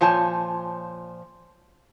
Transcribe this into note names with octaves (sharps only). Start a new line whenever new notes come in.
A#2 F3 C#5 G#5 A5